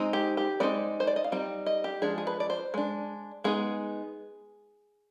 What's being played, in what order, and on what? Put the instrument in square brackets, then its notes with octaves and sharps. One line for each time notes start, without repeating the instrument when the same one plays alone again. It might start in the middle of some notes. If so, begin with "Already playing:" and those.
Already playing: [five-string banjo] G#3 C4 D#4
G4
G4
G#3 C4 D#4 D5
C5
D5
D#5
F5
G3 C4 D#4 G5
D#5
G4
F3 G#3 D4 G#4
G#4
B4
D5
C5
G#3 D4
G#3 B3 D#4 G#4